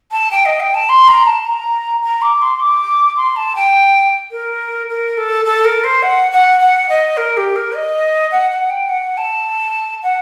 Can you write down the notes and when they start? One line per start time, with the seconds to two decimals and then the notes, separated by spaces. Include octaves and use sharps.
0.11 A5
0.31 G5
0.45 D#5
0.59 G5
0.74 A5
0.89 C6
1.08 A#5
1.26 A5
1.45 A#5
2.03 A#5
2.21 D6
2.41 C6
2.59 D6
3.16 C6
3.36 A5
3.55 G5
4.31 A#4
4.89 A#4
5.17 A4
5.45 A4
5.64 A#4
5.83 C5
6.02 F#5
6.31 F#5
6.60 F#5
6.89 D#5
7.16 A#4
7.36 G4
7.55 A#4
7.74 D#5
8.31 F#5
8.50 F#5
8.69 G5
8.88 F#5
9.17 A5
10.02 F#5